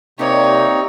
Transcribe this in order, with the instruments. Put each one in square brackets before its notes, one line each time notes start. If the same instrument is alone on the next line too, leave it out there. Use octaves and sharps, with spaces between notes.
[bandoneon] C3 A#3 [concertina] C4 D#4 [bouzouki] G4 D5 [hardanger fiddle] C#5